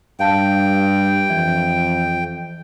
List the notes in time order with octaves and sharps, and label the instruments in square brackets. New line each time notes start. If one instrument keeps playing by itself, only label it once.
[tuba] G2 [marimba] F5 A5 [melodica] G5
[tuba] F2 [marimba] E3